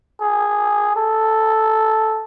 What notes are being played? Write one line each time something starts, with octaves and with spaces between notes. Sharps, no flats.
G#4
A4